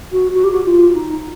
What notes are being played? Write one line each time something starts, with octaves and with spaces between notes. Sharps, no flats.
F#4
F#4
G4
F#4
F4
D#4